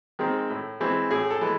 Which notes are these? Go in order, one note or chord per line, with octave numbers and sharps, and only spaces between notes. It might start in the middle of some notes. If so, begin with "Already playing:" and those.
D#3 G#3 C4
A2
E3 G#3 C4
A2 G#4
A4
E3 G#3